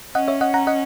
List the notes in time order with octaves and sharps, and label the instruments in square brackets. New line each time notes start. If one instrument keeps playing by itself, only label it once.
[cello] C#4 [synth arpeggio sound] D#5 F#5
[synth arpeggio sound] C#5 E5
D#5 F#5
F#5 A#5
D#5 F#5